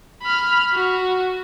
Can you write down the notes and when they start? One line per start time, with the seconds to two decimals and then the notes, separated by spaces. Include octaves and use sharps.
0.22 B5 F6
0.73 F#4